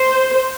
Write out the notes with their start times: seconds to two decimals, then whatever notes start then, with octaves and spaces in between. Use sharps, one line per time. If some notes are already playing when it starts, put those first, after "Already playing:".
Already playing: C5